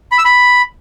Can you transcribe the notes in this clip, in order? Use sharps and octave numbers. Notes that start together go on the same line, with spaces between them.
B5
E6
B5